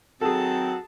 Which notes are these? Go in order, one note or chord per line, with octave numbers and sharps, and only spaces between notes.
D#3 F#3 C4 F#4 G#4 A4 A5